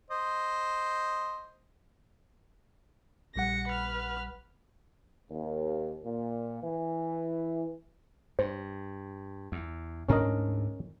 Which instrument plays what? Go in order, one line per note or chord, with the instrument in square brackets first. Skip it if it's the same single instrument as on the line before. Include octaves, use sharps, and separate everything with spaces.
[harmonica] C5 D#5
[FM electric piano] A#1 G3 F#5 [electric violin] A#6 C#7
[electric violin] B4 F6
[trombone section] D#2
A#2
E3
[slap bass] G2 [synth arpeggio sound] C5
[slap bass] E2
[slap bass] D2 G#2 D4 [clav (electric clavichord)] C#4 A#4 D#5